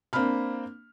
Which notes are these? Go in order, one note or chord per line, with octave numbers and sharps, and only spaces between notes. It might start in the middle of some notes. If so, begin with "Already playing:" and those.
A#3 C4 D4 B5 F6